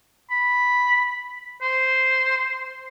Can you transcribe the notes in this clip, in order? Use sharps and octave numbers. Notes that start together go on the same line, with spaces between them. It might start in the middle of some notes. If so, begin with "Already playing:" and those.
B5
C5